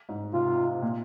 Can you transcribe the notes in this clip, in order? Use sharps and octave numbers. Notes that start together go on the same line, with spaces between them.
G#2
C3 F4
A#2